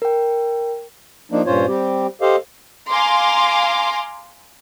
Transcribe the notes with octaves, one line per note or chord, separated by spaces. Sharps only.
A#4 G5
F3 A#3 D4 D#4
G2 A#2 C#4 F4 C5 C#5
G3 C4 G4
G4 A4 C5 D#5 F5
F5 G#5 A#5 C6 D6